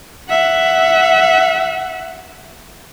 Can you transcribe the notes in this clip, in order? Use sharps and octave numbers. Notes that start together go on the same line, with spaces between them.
E5 F#5